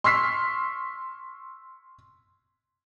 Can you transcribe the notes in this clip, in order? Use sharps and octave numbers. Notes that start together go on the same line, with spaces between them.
C6 C#6 E6 F6 B6 C7